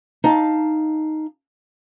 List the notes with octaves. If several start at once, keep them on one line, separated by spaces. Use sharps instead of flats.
D#4 F5 A5